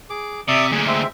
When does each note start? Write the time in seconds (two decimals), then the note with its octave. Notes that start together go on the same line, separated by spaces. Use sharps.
0.10 G#4 D6
0.48 C3 D5 E5 D#6
0.71 D2 A#2 G#4
0.87 G#3 C4 E5